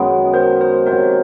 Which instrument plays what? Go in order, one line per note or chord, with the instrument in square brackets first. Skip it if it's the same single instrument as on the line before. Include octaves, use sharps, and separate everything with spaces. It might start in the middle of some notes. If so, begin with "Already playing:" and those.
Already playing: [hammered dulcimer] F#2 D#3 G#3 B3
[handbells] A#4 C5
A#4 C5
[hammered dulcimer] C3 D#3 F#3 [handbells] A#4 C5